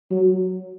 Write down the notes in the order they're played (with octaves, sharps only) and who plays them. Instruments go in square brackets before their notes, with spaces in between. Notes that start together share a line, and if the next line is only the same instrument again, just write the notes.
[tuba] F#3